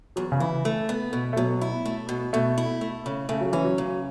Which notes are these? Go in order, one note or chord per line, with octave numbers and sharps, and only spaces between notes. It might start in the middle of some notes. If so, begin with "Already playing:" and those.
E2 F#3
C#3
E3 E4
A3
B3
B2
A3
B2 F#3
E4
A3
B2
B2 A3
E4
A3
C#3
C#3 A3
F#3
E3 C#4
F#3
C#3